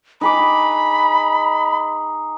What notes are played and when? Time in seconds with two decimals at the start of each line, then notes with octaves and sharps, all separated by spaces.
0.21 D#4 G#4 B5 D6